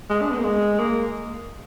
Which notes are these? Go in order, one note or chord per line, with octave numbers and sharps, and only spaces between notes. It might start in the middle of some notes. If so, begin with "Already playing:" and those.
G#3
D4
B3
A#3
G#3
A#3